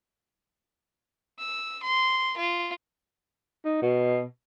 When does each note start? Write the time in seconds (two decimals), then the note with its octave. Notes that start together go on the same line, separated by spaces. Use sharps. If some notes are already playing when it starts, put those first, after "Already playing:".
1.39 E6
1.83 C6
2.37 F4
3.65 D#4
3.82 B2